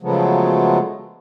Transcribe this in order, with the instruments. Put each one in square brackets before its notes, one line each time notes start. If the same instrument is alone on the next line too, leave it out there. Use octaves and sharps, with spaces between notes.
[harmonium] C#3 F3 F#3 G#3 A3 B3